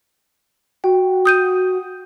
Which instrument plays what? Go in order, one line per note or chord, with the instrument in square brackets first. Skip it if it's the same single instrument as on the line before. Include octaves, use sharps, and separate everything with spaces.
[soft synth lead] F#4 [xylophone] G5
[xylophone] D#6 G6 D#7